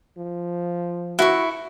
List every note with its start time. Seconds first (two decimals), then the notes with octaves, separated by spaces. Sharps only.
0.17 F3
1.19 E4 F#4 C#6